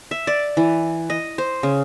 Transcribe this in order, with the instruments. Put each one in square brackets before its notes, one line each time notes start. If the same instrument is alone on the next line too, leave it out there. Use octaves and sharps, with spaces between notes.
[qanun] E5
D5
E3
D#5
C5
C#3